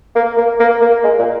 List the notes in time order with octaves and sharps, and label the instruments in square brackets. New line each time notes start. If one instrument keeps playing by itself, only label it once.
[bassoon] A#3
A#3
A#3
A#3
G#3
A#2